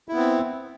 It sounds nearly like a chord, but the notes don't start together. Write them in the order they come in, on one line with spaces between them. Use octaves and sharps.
E4 B3 C4